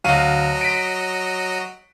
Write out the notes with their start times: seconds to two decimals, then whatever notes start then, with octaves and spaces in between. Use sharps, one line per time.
0.04 D2 F#3 F#4 D#5 F5 D#7
0.61 B6 D7